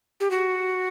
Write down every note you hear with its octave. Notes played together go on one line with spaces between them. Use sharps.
G4
F#4